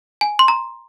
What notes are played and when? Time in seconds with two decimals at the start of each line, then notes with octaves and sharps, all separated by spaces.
0.21 G#5
0.39 C6
0.48 A#5